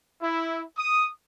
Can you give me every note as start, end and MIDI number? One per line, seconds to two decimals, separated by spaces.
0.22 0.64 64
0.78 1.07 87